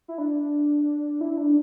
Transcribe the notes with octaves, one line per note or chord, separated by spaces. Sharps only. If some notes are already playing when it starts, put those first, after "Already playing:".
E4
D4
E4
D4